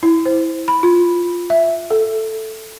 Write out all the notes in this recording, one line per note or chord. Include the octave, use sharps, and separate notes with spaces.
E4
C5
B5
F4
E5
A4